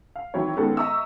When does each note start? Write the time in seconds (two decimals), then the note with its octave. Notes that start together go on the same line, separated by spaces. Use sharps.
0.16 F5
0.34 D#3 E3 F#3 C4 E4 C#5
0.57 D#3 G#3 B3 C#4 A4
0.77 D#5 E5 A#5 C#6 D#6 E6